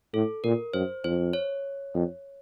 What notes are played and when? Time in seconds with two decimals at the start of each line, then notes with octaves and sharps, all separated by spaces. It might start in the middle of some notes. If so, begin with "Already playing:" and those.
0.14 A2 A4
0.44 A#2 A#4
0.73 F#2 C5
1.04 F2 C5
1.33 C#5
1.94 F2